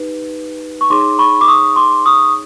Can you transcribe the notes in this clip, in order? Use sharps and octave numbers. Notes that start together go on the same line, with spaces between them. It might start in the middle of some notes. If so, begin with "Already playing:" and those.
Already playing: D#4 G4 B4
C#6
D#4 G#4 C#5 C6 D6
B5 C#6
D6
C#6 D#6
C6 D6
C#6 D#6